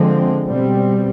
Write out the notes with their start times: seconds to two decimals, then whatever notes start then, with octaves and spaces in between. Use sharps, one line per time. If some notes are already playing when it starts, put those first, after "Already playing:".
Already playing: D3 F3 G#3 C4
0.46 B2 G3 C4